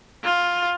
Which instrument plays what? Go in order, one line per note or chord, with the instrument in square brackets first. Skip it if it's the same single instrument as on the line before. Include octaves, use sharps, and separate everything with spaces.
[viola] F4